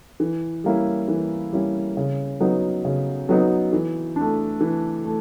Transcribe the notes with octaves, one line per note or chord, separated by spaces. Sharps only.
E3
G3 A#3 C#4 E4
E3
G3 A#3 C#4 E4
C#3
F#3 B3 D#4
C#3
F#3 B3 D#4
E3
A3 D4
E3
A3